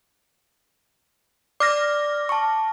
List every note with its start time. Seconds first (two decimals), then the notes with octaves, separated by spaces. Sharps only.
1.60 D5 D6 F6 A#6
2.29 A5 C#6